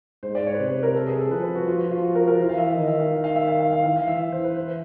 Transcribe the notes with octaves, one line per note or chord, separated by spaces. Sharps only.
G#2 C5
D5
C#5
B4
C3 C5
B4
A#4
A4
G#4
A4
F3 B4
B4
F#4
F4
F4
F4
F#4
A#4
A#4
E3 C5
F5
E5
D#3 D#5
E5
F5
F5
E5
F5
F5
F5
E3 F5
F5
E5
E3
C5
B4
C5